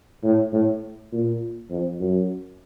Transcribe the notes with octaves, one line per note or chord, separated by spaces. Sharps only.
A2
A2
A#2
F2
F#2